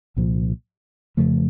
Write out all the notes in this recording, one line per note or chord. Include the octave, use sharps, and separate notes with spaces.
C2 A#2 F3
F2 C#3 F3 A3